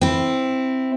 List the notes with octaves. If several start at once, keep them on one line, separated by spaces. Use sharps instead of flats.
C4 E4